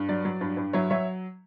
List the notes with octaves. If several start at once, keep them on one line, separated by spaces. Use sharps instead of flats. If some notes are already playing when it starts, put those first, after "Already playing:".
Already playing: G2
F#3 D5
F#3
G2
G2
F#3 C#5 E5
F#3 C#5 E5